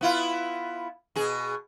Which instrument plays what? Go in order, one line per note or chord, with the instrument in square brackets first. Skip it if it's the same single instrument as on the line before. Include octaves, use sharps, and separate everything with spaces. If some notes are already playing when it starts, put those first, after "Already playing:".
[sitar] B3 E4 F4
B2 G#4